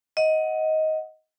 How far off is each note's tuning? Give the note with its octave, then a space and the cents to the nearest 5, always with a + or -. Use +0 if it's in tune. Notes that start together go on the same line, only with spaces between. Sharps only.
D#5 +15 F#5 +0